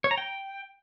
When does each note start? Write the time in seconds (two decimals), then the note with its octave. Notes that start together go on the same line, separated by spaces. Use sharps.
0.04 C#5
0.11 A#5
0.18 G5